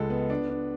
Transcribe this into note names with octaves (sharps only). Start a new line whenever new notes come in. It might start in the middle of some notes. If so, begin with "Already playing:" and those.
Already playing: C#2 G#3 A4
B3
D4
D4